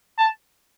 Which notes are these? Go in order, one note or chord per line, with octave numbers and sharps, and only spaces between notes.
A5